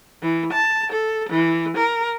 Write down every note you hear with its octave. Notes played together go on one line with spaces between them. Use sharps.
E3
A5
A4
E3
A#4